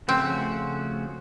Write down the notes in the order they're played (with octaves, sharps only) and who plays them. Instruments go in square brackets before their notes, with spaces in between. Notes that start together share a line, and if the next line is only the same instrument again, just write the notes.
[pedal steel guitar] C#3 F3 A3 C#4 F#4 [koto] C4